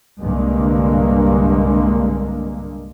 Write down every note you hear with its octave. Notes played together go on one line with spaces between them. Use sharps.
C2 G2 D3 G#3 A#3